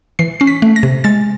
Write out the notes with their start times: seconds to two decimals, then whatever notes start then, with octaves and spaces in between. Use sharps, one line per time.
0.19 E3 C7
0.40 C#4 C7
0.47 B6
0.62 A3
0.76 A#6
0.83 C3
1.04 G#3 A6